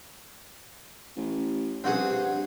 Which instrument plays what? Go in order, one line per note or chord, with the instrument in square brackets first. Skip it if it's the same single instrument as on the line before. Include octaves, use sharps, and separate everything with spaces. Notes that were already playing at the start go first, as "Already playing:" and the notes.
[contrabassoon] A1
[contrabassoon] G2 [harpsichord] C4 F#4 G#4